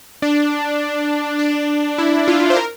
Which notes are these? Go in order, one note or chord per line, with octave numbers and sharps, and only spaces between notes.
D4
D4
E4
F4
C5
A#4